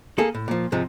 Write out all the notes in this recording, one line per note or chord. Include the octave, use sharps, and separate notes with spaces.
A#3 G#4 A4
A2
A#2 F3
G#2 C3 F3 G#3